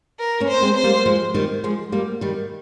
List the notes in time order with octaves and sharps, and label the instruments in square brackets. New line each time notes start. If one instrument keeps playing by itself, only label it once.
[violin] A#4
[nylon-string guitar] A#3 C#4
[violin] C5
[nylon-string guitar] G#3 C4
[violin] C5
[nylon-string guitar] G3 A#3
F3 G#3
D#3 G3
F3 G#3
G3 A#3
D#3 G3